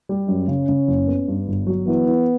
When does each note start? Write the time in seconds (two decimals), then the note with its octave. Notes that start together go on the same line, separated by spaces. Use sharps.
0.09 G3
0.28 F#2 C#4
0.48 C#3
0.69 C#3
0.88 F#1
1.08 B3
1.28 G2
1.48 G1
1.67 F#3
1.87 E3 B3
2.07 E3